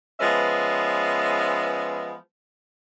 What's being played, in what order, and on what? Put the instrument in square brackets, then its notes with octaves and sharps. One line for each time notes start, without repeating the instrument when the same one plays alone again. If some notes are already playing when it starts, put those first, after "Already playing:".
[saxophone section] F3 G#3 B3 C#4 B4 E5